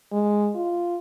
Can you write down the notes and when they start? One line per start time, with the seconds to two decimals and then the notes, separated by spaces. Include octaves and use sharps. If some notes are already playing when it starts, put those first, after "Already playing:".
0.12 G#3
0.55 F4